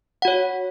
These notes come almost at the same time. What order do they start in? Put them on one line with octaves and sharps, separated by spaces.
F#5 F#4 C#5